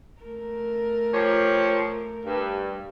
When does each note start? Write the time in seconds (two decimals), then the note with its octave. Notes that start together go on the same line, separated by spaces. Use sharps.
0.22 A3 A#4
1.12 F3 G4 C#5
2.24 G2